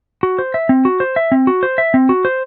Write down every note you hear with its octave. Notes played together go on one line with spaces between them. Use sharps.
F#4
C5
E5
C4
F#4
C5
E5
C4
F#4
C5
E5
C4
F#4
C5